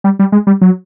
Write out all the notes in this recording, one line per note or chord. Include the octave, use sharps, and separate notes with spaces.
G3
G3
G#3
G3
F#3